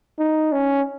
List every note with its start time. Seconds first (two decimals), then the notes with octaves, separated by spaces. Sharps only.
0.19 D#4
0.52 C#4